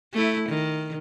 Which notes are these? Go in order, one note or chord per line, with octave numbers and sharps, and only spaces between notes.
A3 E4
D#3